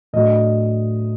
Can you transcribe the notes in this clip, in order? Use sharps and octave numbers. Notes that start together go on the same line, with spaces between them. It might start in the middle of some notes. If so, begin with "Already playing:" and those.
A2 F#3 A3 D4 D#5